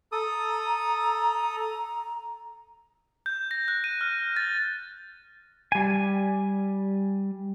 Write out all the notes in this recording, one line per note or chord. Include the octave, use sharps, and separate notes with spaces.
A4 A#5 D#6
G6
A#6
F#6
D#7
F6
A6
G3 G#5